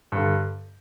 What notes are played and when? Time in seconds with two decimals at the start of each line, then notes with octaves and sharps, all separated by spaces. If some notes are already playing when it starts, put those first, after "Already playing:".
0.12 G2 D3